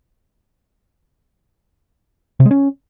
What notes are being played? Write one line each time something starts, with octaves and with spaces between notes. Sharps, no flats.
C3
G#3
C#4